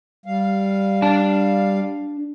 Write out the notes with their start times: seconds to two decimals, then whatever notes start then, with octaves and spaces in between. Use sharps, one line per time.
0.26 G3 F5
1.02 D4 A5